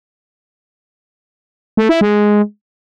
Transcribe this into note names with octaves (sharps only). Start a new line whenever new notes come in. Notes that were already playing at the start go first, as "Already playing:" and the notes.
A3
E4
G#3